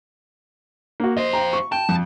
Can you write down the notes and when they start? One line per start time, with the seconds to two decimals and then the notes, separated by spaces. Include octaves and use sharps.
1.00 A#3 F#4
1.17 F2 C5 D#5
1.33 G5 A#5
1.53 C#6
1.72 G5 A5
1.89 F2